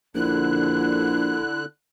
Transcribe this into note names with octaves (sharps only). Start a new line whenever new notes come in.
A#1 D3 E4 F#6